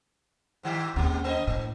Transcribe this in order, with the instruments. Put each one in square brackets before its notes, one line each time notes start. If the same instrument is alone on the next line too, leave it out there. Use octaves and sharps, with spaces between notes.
[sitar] G#2 D#3 G4
[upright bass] D#2 C#4 [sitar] B2 G#3
[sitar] A#3 C5 D#5
[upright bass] A2 [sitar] A#3